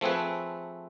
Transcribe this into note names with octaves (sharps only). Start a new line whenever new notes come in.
F3 A3 C4 G#4 B4